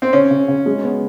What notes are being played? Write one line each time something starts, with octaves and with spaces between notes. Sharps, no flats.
C4
C#3 C#4
C#3
C#3
G#3
B3